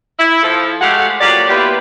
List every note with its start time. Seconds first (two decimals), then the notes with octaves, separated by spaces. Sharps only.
0.19 E4
0.43 F3 A4
0.81 G#3 A3 G4 F5 F#5
1.21 F#3 A#3 F4 G4 D5
1.49 A#3 B3 E4 F4 G4 B4